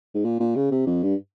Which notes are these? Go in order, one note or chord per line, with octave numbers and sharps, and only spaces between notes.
G#2
A#2
A#2
C#3
C3
F2
G2